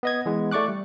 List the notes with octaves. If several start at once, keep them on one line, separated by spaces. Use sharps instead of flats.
B3 D#5 G#6
E3 G#3 B3
A3 D5 C#6 D6 F#6
G3